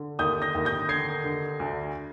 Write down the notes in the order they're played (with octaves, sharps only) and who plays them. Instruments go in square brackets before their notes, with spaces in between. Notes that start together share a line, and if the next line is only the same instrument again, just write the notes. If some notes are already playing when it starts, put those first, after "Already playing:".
Already playing: [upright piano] D3
D#2 D#6 G6
G6 A#6
D#2
G6 A#6
D3 G#6 C7
D3
D2